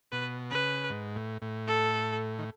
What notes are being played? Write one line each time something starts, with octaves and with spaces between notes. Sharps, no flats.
B2 B4
C#3 B4
G#2
A2
A2
A4
D#3